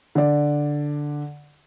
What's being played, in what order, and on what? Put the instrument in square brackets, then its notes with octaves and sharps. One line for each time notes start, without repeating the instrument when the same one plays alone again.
[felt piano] D3 D5